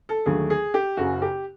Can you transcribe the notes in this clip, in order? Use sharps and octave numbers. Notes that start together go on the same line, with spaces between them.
A4
D#2 D3 F#3 A3 G#4
G#4
G4
F#1 F#2 C#3 F#4
G4